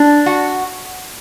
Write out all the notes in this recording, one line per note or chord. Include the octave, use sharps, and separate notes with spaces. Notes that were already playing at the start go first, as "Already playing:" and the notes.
Already playing: D4
F#4